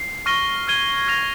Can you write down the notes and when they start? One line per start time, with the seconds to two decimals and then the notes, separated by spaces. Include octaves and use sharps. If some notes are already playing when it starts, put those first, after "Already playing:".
Already playing: C7
0.26 C#6 F6 A#6 D#7 G7
0.68 F6 G#6 D#7 G7
1.08 F6 A#6 F7